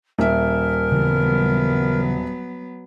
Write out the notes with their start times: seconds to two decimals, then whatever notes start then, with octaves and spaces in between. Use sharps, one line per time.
0.18 D#1 A#4 E5
0.92 C#3 E3 F#3 G3 B3